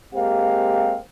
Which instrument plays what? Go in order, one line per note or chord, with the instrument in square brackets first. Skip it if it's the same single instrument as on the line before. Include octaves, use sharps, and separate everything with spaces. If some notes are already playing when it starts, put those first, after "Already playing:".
[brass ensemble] G#3 A#3 C4 G4 F5